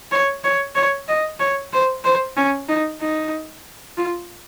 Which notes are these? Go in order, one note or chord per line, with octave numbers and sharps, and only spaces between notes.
C#5
C#5
C#5
D#5
C#5
C5
C5
C#4
D#4
D#4
F4